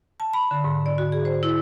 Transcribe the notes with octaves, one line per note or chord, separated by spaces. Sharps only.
A5
B5
D3
G#2
D5
F#4
G#4
C5
E4